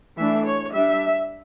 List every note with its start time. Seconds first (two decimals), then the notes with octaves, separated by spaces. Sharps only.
0.17 E3 A3 D4 E5
0.45 C#5
0.73 G3 D4 E5